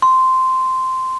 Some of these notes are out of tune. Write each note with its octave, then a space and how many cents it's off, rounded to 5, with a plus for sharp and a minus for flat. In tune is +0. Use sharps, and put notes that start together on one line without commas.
C6 -10